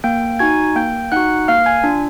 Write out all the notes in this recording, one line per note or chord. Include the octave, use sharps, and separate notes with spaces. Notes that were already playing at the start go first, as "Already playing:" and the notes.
A#3 G5 G6
D#4 F#4 G#5 G#6
A#3 G5 G6
D#4 F#4 F#5 F#6
A#3 F5 F6
G#5 G#6
D4 F4